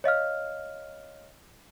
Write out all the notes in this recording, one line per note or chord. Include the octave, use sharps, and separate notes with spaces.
C#5 D#5 F5 F6